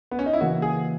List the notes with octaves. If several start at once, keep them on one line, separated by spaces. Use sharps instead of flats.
B3
C#4
D#4
E4
C#3 E3 A#3 F#4
G#4